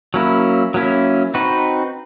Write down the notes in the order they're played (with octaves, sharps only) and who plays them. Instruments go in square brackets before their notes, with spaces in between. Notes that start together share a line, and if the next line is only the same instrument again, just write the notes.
[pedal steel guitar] F#3 A#3 C#4 E4
F#3 A#3 C#4 E4
C4 D#4 F#4 B4